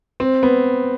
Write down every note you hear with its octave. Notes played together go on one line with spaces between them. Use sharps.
C4
B3